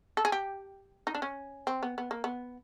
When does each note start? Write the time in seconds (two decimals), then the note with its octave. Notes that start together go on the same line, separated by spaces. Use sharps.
0.17 A4
0.25 G#4
0.32 G4
1.07 D#4
1.15 D4
1.22 C#4
1.67 C4
1.83 B3
1.98 B3
2.11 A#3
2.24 B3